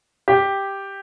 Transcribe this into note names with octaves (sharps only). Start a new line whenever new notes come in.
G4